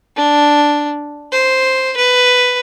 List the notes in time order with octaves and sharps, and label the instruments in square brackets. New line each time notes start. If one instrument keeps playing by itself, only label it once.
[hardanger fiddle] D4
C5
B4